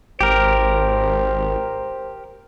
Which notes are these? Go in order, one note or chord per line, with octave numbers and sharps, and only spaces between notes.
G#1 G4 A#4 C5